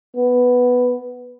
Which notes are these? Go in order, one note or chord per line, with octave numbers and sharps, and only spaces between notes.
B3